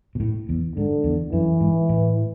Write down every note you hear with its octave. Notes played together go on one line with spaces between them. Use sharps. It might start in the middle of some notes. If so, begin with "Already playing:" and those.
B2
A2
E2
G#2 D3
E2
F#2 E3
G#2
A2